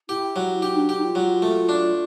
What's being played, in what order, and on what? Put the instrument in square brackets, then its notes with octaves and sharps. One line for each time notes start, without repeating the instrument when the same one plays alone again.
[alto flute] E4 [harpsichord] G4
[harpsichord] F#3
[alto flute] D#4 [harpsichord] G4
[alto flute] D4
[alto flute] D#4 [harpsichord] G4
[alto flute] F4
[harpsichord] F#3
A3
D4